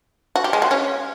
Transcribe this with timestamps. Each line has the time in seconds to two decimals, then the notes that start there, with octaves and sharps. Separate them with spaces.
0.36 F#4
0.44 G4
0.53 G#3
0.62 F#4
0.71 C#4